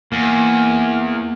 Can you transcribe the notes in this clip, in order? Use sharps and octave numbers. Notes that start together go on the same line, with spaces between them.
E2 A#3